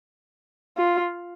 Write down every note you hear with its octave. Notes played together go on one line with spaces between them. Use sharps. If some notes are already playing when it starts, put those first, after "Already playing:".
F4